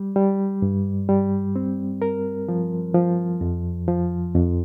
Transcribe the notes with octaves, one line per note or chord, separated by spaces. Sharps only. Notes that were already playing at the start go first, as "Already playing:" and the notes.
Already playing: G3
G3
G2
G3
C4
A#4
F3
F3
F2
F3
F2